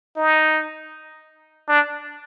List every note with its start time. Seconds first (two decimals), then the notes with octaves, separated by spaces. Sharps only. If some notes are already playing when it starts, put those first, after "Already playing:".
0.17 D#4
1.68 D4